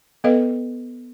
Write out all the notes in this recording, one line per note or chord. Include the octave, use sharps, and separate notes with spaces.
B3 A4 B4 D#5 F5